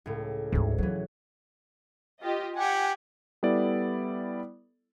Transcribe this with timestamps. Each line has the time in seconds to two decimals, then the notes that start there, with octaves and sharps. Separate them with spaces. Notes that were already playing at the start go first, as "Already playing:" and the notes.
0.06 C#2 A2
0.52 D2 G#2 D#4
0.78 E3 F#3 D#4
2.22 F4 G4 D#5
2.56 G4 F#5 G#5
3.43 G3 B3 E4 A4 D5